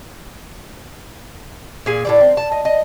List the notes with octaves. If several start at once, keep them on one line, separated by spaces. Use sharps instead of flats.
A#2 G#4 G#5
A2 G3 D5
C4
A5
D#5
D#5